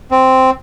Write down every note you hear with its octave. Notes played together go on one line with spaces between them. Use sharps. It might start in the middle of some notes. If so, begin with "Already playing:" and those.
C4